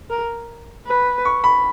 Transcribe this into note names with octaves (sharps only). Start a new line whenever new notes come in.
A#4
B4
C#6
B5